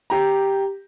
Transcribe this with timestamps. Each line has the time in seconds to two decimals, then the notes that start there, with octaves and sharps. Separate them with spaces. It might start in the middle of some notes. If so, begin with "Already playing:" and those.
0.10 G4 A#5